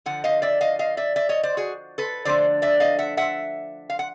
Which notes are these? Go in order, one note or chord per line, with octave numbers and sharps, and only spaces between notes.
D3 F3 F#5
D#5 F5
D5 E5
D#5 F5
D#5 F5
D5 E5
D5 E5
C#5 D#5
C5 D5
F#4 G#4
A4 B4
D3 F3 A3 D4 C5 D5
D5 E5
D#5 F5
E5 F#5
E5 F#5
F5
F#5